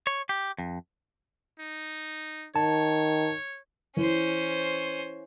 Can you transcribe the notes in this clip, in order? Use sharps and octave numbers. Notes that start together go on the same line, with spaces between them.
C#5
G4
F2
D#4
D#3 C#5 A5
E3 C#4 C5